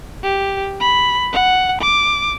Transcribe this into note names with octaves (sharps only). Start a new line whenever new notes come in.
G4
B5
F#5
D6